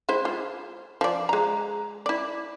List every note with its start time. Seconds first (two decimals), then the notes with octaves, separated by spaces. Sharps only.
0.09 G#3 E4 C5
0.25 F4
1.01 F3 D5
1.29 G#3 A#5
2.06 E4 D5